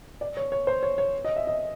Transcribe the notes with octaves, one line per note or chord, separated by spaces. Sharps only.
D5
C#5
C#5
C5
C#5
C#5
D#5
E5
D#5